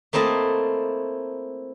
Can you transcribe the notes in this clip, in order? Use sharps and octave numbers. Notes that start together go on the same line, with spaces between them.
A3 A#3 C4 E4 D#5 A5